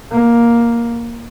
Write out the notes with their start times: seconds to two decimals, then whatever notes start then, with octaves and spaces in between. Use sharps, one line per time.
0.12 A#3